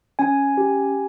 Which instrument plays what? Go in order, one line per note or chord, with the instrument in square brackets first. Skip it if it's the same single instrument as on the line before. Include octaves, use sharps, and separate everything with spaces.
[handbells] C#4 G#5
G4